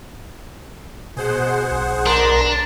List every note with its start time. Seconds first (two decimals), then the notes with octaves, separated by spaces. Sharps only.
1.17 B2 G#4 C5 F#5
1.71 B1
2.06 D4 A#4 A#5 C6